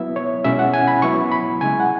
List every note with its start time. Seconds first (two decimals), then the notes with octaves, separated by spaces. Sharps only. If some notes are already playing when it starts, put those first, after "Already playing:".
Already playing: F#3 B3 E4 E5
0.16 C#5
0.45 B2 G#3 C#4 E4 E5
0.59 F#5
0.74 G#5
0.88 B5
1.02 F#3 B3 E4 C#6
1.32 B5
1.61 C#3 G#3 E4 G#5
1.80 F#5